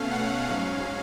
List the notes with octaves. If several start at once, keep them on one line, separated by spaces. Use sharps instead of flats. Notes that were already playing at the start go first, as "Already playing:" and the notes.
Already playing: B2 A3 C#4 F5
F#5
G#2 F#3 C#4 F5